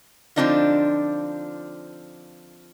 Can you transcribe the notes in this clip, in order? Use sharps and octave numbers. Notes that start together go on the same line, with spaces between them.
D3 F3 C4 D4 D#4 F4